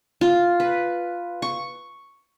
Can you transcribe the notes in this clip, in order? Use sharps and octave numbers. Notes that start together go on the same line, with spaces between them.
F4
B4
C#6